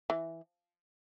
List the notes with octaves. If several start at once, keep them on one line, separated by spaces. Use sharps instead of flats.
E3